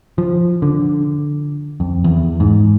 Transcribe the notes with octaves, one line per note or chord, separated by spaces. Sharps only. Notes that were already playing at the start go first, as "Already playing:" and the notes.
F3
D3
F2
E2
G#2